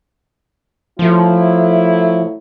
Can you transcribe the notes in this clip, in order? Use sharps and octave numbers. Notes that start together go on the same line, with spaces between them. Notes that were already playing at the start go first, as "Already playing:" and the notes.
F3 F#3 A3 E4